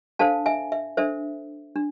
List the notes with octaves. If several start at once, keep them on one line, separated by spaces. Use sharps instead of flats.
D4 A4 C5 F5 A5
E5 G#5
E5
D4 A4 C5 E5
D4